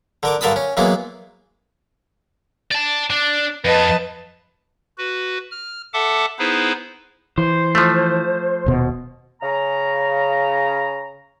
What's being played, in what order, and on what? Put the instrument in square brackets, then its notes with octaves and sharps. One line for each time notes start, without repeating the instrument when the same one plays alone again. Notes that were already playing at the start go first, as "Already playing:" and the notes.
[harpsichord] D3 A#4 D6
G2 D3 A#4 A5 B5 D#6
C#4
E3 F#3 G#3 A#3 B3
[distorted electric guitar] D5 A5
D4
[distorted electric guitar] F2 [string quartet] B4 D#5 A5
[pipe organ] F#4 B4
F6
A4 E5 F#5 A5 D6
B3 D#4 E4 G#4 B4 C5
[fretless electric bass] E3 [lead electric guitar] C5
[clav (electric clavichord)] F3 A3
[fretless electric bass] D#1 B2
[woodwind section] C#3 A#5